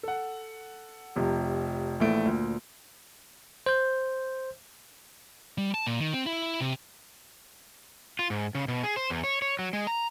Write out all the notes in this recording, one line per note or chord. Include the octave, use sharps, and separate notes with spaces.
A4 F#5
F1 C3 F3
A#1 E3 A3 D7
D2 A#2
C5 G6
G3
A5
A#2
D#3
C4
E4
C3
F4
G#2
C#3
B2
G#4
C5
E2
C#5
C#5
F#3
G#3
A#5